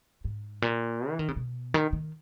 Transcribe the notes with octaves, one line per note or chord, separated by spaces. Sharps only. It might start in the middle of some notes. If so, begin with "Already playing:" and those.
G#2
A#2
E3
D#3
C#3
B2
D#3
D#3